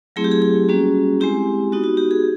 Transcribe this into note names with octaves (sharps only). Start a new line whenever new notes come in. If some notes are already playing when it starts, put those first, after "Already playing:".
F#3 A3 C4 E4 G#4
G4
G#4
G#4
G3 A#3 C#4 F#4
G#3 C4 E4 G4
B3 D#4 F#4
F#4
G4
G#4